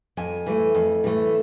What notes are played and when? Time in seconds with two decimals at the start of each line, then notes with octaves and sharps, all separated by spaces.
0.17 F2 G#5
0.46 E3 A3
0.75 F2
1.04 E3 A3